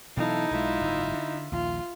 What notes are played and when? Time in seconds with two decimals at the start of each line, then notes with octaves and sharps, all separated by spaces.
0.17 B2 E3 F#3 D#4 E4 A4 F5
0.51 B1 G#3 F4 E5
0.81 F#1 G#2
1.14 D3
1.52 A#1 D#2 F4